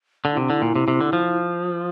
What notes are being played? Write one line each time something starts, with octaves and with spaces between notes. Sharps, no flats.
D3
E4
C3 D4
D3 E4
A#2
C3
C3
D3
F3